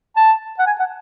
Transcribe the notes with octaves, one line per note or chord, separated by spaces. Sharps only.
A5
F#5
G#5
F#5